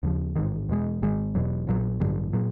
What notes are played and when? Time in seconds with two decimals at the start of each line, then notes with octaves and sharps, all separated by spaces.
0.03 D#2 C#3 F3
0.36 A1 G#2 D#3
0.69 E2 B2 G#3
1.02 G#1 G#2 D#3 G#3
1.35 E1 E2 B2 F#3
1.67 A#1 A#2 F#3
2.00 A1 G2 D3 F#3
2.33 A#2 F#3